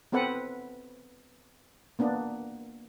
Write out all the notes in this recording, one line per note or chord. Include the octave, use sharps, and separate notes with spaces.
B3 C4 A4 B4 F#5
A#3 B3 D4